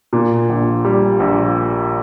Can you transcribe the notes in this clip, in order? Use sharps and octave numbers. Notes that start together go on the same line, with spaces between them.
A#2
A#1
G3
A#1